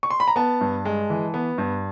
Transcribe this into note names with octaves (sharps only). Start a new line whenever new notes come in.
C#6
C6
B5
A#5
B3 A5
G2
G#3
E3
B3
G2